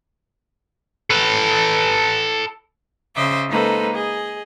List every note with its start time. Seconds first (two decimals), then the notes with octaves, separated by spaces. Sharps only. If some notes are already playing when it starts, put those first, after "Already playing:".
1.10 A4 B4
3.15 C#3 C5 D#5 E5 D6
3.48 G#3 A#3 D#4 A4 B4 C5
3.92 G#4 D#5